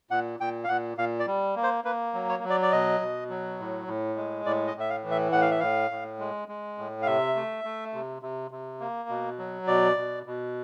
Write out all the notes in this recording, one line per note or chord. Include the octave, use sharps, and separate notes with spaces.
A#2 F#5
A#2 G5
F5
A#2 F#5
A#2 F5
D5
G3
A#3
C5
A#3 B4
F#3
C#5
F#3
D5
D5
B2 D#5
B2
F#3
A2
A2
G#3
A2 D5
D#5
A2 E5
F5
E3
E5
A2 F#5
F5
E5
A2 F5
A2
G#3
G#3
A2
F5
C3 E5
A3
A3
C3
C3
C3
A#3
B2
F#3
B2 D5
B2
B2